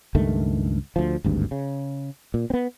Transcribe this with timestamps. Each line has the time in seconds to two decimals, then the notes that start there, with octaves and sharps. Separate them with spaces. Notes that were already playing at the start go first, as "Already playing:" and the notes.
0.15 C#2 G2 D#3 A3
0.96 D2 F3
1.24 G#1 D2 G2
1.51 C#3
2.34 A#2
2.50 B3 C4